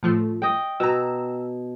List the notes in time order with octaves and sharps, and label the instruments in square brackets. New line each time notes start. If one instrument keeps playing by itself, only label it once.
[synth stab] A2 F3 A3
[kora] D#5 G5
[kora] B2 [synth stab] A#5 E6